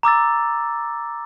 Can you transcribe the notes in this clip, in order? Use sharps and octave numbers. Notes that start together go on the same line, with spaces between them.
A#5 D6 E6 A6